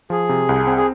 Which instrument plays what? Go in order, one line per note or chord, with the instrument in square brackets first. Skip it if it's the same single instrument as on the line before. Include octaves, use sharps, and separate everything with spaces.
[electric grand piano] F3 [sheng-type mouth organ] G#4
[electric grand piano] C3
C2
C4
[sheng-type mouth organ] G#4